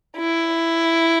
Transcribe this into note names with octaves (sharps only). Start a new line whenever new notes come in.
E4